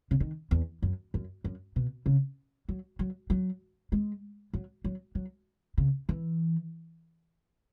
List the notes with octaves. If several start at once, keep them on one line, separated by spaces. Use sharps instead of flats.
C#3
D#3
E2
F#2
F#2
F#2
B2
C#3
F#3
F#3
F#3
G#3
F#3
F#3
F#3
C#3
E3